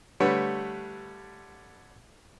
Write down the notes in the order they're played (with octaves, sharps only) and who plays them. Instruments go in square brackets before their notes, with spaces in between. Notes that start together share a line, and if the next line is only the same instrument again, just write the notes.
[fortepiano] D3 G3 A3 B4 C#5